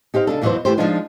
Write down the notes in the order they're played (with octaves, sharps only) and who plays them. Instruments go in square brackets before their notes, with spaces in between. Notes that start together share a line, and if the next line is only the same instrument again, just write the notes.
[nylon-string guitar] D#4 G4 C5 F5
C#3 D4 A4
D#2 B2 E3 F#3 E4 C5
E3 A3 G4 C5
F3 F#3 G#3 D4 D#4 F4